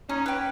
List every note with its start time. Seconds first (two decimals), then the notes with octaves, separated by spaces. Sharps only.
0.09 C#4 D#4
0.26 G4 B4